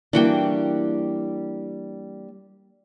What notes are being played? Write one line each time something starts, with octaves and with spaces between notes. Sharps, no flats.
E3 G3 A#3 D4 F#4 G5